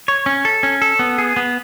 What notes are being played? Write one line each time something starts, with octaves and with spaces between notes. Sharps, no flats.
C#5
C#4
A4
C#4
A4
B3
G#4
B3